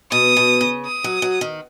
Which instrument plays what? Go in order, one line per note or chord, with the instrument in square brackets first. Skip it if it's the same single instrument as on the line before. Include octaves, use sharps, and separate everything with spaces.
[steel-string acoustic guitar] B2 [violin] D#6
[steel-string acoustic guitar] B2
C#3
[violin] D#6
[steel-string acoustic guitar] F#3
F#3
D#3